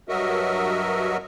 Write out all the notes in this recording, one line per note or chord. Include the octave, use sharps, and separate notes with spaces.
G2 F#3 F#4 A#4 D#5 E5